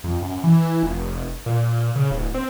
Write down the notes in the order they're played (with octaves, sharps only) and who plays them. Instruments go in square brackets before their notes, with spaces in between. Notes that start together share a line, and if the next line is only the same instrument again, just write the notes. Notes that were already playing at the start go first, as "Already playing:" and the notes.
[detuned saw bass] F2
F#2
E3
F1
A#2
C#3
D1
C4